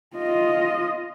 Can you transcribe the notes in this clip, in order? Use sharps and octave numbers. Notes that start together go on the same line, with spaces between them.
F4 D#5